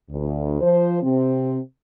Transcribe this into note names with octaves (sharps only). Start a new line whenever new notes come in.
D2
F3 C5
C3 C4